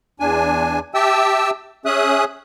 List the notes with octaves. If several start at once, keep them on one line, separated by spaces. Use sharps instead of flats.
E2 D4 G#5
G4 E5 G5 A5 E6
C#4 G#4 E5 D#6 F#6